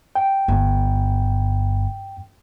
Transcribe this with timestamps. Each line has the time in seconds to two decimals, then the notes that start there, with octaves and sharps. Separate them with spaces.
0.15 G5
0.48 G1